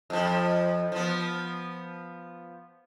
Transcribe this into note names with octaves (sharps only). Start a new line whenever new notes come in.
F2 F3
F3 B3